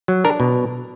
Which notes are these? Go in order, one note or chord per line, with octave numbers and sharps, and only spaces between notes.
F#3
D4 A#4
B2